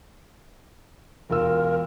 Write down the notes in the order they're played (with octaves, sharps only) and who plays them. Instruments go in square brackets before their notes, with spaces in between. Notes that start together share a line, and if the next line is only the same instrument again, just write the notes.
[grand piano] E1 F4 E6 [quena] A#4